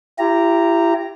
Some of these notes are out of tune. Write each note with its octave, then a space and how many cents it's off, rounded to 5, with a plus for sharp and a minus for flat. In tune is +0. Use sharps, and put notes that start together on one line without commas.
E4 +35 G4 -5 A#5 -5